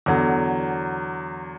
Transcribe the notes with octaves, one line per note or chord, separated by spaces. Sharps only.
E2 D3 F#3